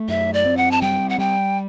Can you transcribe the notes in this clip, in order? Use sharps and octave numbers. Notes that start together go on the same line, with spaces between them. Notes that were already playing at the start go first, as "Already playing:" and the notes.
Already playing: A3
F#2 E5
D5
C4
F#5
A5
G3 G5
F#5
G3 G5